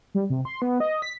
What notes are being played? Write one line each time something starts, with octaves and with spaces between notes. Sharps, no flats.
G3
C3
C6
B3
D#5
B6